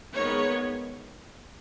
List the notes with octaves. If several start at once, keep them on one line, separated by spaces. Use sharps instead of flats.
D#3 G#3 B3 C#5